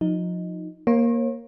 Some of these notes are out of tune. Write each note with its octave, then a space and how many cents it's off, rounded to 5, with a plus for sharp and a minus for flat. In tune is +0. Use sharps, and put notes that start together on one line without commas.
F3 +35 D#4 +0
A#3 +10 C#5 -40